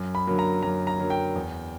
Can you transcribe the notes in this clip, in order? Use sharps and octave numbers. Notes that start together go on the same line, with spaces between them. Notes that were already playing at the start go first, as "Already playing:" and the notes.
Already playing: F#2
B5
D3 F#3 A#3
A#5
F#2 A#5
A#5
D3 F#3 A#3
G5
E2